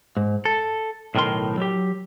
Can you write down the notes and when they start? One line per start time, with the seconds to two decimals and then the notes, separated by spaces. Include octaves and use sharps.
0.17 G#2
0.45 A4
1.15 B1 A2 D#3 A#4 C6
1.58 F#3 G4